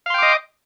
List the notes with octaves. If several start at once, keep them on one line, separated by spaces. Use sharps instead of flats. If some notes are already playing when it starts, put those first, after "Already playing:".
D#5 F5 G5 C6 D6